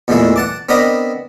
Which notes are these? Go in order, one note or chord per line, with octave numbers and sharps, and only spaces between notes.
E2 A#2 E3 G#3 A3 E4
F#5 A5 D6
B3 C4 D4 A#4 D#5 B5